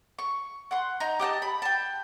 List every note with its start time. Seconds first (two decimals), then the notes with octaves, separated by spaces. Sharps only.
0.19 C#6
0.71 F#5 C6
1.00 D#4 A#5
1.19 G4 D#5 G5 A5
1.42 B5
1.62 G5 A5